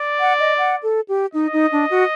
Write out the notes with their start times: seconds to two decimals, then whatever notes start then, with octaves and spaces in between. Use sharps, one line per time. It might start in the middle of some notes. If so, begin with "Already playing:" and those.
Already playing: D5
0.20 F#5
0.40 D#5
0.58 F#5
0.83 A4
1.09 G4
1.34 D#4 D#5
1.53 D#4
1.72 D4
1.90 F#4